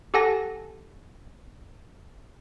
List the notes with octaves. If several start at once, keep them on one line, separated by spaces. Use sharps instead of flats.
G4 A4 F#5 G#5 A5 A#6